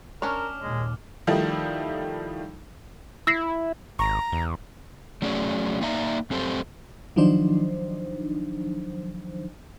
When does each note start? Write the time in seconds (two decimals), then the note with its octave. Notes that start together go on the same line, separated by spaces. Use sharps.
0.22 C#4 D4 A#4 C#5 D6 F6 F7
0.62 D#2 A#2 G#3
1.27 D#3 F3 G3 A3 D#4 E4
3.27 E4 E6 A#6 C7
3.99 G#1 A#5 C#6
4.32 E2
5.22 F#3 A3 C#4 G#4 D5
5.81 A#3 D#4 D5 E5 A5 A#5
6.30 F#2 C4 G4 A4 C5
7.16 D#3 F3 F#3 D4 D#4 C5